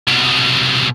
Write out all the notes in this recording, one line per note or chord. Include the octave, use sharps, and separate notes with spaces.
C2 B2